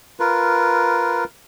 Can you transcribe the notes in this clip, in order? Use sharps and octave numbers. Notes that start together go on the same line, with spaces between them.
F4 A#4 B4